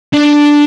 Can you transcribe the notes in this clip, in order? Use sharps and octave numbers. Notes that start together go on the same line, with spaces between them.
D4